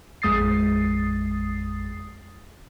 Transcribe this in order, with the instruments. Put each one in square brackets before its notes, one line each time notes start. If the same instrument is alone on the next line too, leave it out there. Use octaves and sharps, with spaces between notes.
[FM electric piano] A1 F2 G#3 D#6 A6 C7